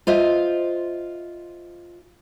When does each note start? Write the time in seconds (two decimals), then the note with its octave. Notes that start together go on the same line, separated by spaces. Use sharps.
0.07 F4 C5 D#5 E5